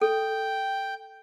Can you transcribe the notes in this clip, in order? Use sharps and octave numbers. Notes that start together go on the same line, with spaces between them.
A4 G5